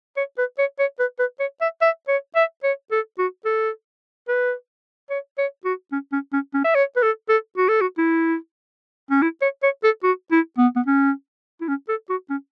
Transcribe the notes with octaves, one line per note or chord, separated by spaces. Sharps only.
C#5
B4
C#5
C#5
B4
B4
C#5
E5
E5
C#5
E5
C#5
A4
F#4
A4
B4
C#5
C#5
F#4
C#4
C#4
C#4
C#4
E5
C#5
B4
A4
A4
F#4
A4
F#4
E4
C#4
E4
C#5
C#5
A4
F#4
E4
B3
B3
C#4
E4
C#4
A4
F#4
C#4